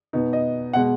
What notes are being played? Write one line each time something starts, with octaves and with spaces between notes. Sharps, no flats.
B2 B3 D#4
D#5
B2 G#3 F#5